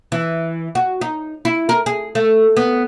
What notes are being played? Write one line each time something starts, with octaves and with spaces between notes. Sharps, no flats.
E3
F#4
D#4
E4
A#4
G#4
A3
B3